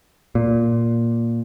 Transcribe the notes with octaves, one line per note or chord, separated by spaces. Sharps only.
A#2